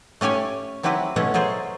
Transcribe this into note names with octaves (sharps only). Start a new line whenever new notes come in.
A3 C#4 G4 C#5 G#5
F#3 C4 E4 G4 B4 F#5
B2 A3 B3 C#4 E4 F#5
F#3 G#4 A4 C5